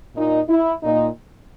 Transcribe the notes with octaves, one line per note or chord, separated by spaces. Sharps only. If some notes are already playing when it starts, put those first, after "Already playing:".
A#2 D#4
E4
A#2 D#4